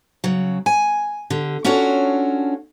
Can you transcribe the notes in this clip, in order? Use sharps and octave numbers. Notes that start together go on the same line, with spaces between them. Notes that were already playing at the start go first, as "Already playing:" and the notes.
C#3 F#3
G#5
D3 G4
C#4 D4 F4 F#4 A4 C#5